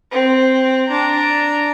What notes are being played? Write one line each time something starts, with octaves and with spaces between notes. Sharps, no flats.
C4
D4 A#5